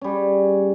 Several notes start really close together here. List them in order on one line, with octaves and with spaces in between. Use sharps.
C#4 G3 G#4